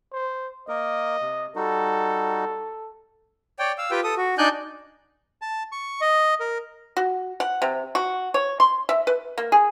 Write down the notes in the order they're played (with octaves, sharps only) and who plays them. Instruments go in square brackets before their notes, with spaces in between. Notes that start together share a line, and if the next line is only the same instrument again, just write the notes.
[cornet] C5
[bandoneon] A#3 A#4 [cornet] D#5
[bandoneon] C3
[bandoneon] G3 D#4 F#4 [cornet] A4
[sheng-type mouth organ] C#5 D5 G5
F5 E6
F4 G4 B4 G5
A4 D#6
F#4
D4 D#4 D5 G#5 F#6 G6
[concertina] A5
C#6
D#5
A#4
[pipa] F#4
F#5
C3
F#4
C#5
C6
E5
B4
A#3
G#4